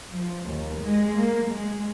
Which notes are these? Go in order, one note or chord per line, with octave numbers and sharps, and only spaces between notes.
F3
D#2
G#3
A#3
G#3